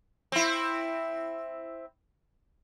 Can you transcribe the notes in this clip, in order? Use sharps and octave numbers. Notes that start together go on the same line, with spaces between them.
C4 E4